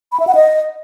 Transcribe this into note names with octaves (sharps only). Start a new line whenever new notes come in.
B5
E5
F#5
D#5